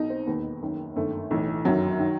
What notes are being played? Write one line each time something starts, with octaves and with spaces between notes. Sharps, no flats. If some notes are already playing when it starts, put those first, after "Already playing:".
Already playing: B1 B2 D#4
C4
E1 D#2 D#3 B3
F#1 F#2 D#3
G1 F#2 D#3 A3
B1 A2 E3
G1 F#2 D#3 F#3
D#3